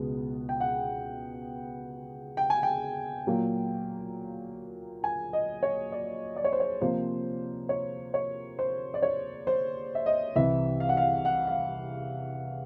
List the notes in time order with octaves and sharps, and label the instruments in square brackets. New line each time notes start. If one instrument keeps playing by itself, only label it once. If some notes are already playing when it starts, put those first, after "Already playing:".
Already playing: [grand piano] C#2 B2 G#3 B3
G5
F#5
G5
G#5
G5
A#2 F#3 A#3
G#5
D#5
C#5
D5
D5
C#5
C5
C#5
C3 F3 A#3 C5
C#5
C#5
C5
D5
C#5
C5
E5
D#5
C2 C3 E3 E5
F5
F#5
F5
F#5
F5